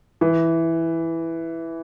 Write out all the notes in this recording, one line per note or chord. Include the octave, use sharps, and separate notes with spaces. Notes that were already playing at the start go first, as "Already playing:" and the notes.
E3